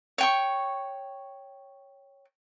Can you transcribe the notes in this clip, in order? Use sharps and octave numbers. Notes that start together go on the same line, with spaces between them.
C#5 G5 C#6